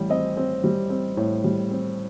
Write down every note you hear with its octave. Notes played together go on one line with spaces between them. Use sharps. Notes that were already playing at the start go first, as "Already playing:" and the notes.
Already playing: A1 G3
C4 D#5
C4
G3
C4
A2
G3
C4